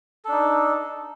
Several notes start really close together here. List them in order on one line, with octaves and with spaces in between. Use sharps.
A4 D4 D#4